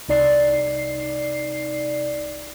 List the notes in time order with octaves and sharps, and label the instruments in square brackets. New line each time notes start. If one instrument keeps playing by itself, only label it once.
[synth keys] C2 D#4 D5 C7